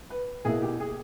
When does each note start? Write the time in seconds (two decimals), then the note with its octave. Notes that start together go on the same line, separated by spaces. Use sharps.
0.10 B4
0.45 B2 A#3 E4 G#4
0.62 G4
0.80 G#4